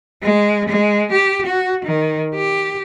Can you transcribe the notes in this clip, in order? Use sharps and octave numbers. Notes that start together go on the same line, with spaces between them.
G#3
G#3
G4
F#4
D#3
G4